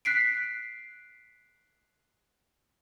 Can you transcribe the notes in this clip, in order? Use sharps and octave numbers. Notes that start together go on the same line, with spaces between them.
F#6 B6 C7 D7